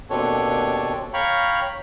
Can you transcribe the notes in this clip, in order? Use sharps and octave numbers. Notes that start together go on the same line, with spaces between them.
D#2 B2 C4 D4 A4 C#5
C#5 F5 G5 A#5 B5 C#6